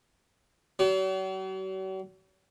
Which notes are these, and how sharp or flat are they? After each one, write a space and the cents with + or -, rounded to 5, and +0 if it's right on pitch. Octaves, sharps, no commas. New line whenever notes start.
F#3 +45